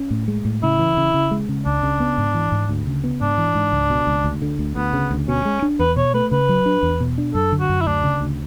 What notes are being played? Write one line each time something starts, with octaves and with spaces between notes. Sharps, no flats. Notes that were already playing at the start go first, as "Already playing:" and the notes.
Already playing: C#4
A2
G#3
A2
C#3 E4
E3
C#3
C#3
G#3
C#3
C#2 D4
C#3
B3
G#2
E3
G#2
D2
C#3
B3
G#2 D4
E3
G#2
C#2
B2
C#2
D2
D3
D2
D2 B3
C#3
D2
B2 C#4
G#3
D4
E2 B4
B2 C#5
A3 B4
C#3 B4
F#3
D4
E2
B2
D4
F#2 A4
D3
F#4
F#2
E4
D2 D4
C#3
D2